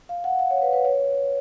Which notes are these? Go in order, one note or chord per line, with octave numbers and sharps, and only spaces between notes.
F5
F#5
F5
C#5
B4
B4
C#5